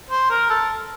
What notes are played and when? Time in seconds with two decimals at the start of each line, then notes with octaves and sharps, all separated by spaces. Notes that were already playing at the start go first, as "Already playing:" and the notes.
0.10 C5
0.30 A#4
0.49 A4